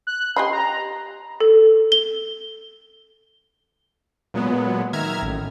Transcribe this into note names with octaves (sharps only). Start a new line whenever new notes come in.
F#6
G4 D#5 B5 C6
A#5
A4
G7
A#2 F#3 G#3 B3
D#3 E5 A#5 F6 G#6
A1